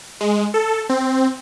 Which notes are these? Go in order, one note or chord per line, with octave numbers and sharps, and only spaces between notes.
G#3
A4
C4